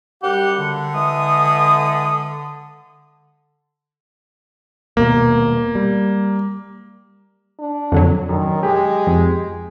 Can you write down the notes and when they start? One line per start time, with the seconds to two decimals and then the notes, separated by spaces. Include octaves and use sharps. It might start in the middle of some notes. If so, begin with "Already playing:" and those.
0.22 F#2 G3 G4 F#5
0.58 D3
0.94 E3 G#3 D#6
4.97 D#1 B2 A#3
5.75 G3
7.59 D4
7.92 F2 D3 F#3
8.29 F#2 D#3
8.63 G#3 G4
9.07 F2